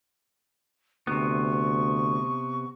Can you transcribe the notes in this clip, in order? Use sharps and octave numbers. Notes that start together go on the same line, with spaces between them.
D2 C3 B3 C#6